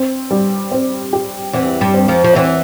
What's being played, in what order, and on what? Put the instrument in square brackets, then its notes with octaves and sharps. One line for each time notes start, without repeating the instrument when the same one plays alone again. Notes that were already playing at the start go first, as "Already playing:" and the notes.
Already playing: [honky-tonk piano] C4
G3
C4
G4
[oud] E2 E3 [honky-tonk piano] C4
[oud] G2 G3
[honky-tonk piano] C4
[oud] F2 F3
F3
[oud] E2 E3 [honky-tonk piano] C4